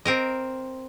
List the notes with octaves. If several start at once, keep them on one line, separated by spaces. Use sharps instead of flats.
C4 A#4 D#5